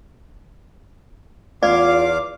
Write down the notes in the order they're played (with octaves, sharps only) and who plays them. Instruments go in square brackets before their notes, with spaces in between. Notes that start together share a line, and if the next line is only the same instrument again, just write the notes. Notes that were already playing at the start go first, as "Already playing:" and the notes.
[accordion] E2 F5 D6 [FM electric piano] F4 [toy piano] D5